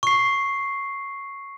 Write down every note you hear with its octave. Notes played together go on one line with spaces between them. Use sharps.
C#6 C7